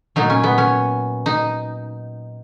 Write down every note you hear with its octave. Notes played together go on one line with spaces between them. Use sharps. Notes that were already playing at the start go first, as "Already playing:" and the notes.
A#2 F#3 D#4
C#4
B3
C#4
D#4